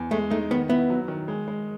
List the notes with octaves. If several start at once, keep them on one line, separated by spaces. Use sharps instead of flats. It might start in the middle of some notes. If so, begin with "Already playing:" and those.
Already playing: E2
G#3 A3
A3 D#4
D#3 B3
B3 E4
F#3
D#3
G#3
G#3